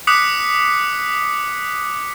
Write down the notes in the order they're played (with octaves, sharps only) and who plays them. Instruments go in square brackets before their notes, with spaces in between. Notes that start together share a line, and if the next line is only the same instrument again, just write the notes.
[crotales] D6 D#6 F#6 B6 C#7